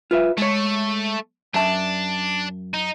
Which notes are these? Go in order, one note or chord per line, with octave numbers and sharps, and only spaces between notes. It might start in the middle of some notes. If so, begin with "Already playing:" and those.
F4 B4 E5
G#3 A3 C#5
F#2 D4 E5 A5
D#4